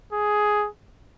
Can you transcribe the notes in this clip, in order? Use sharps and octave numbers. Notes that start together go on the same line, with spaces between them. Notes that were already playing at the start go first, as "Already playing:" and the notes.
G#4